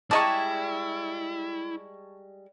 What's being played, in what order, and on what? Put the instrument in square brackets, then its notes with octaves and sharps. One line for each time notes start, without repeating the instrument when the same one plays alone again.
[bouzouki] G3 G#3 [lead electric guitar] E4 [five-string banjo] D5 D#5 A#5 [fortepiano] A5 C#6